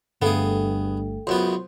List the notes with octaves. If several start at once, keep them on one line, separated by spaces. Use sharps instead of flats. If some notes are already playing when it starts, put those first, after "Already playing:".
G1 G2 A3 B3 G#4 A4 F5 G5
C#2 F#2 B3 C5